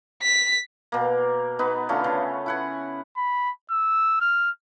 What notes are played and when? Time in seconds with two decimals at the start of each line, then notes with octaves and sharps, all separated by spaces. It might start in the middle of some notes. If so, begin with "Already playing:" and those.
0.23 B6
0.92 B2 A#3
1.59 B3 D#4 B4
1.89 D3 A3 C#4 F4
2.04 C#3
2.46 E4 F#5 G#5
3.17 B5
3.71 E6
4.21 F6